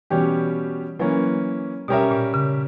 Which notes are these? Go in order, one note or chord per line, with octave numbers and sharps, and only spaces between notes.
B2 E3 G3 C#4 G4
E3 F#3 A#3 C#4
B2 G3 C#4 G4 A#4 E5
A#2
C#3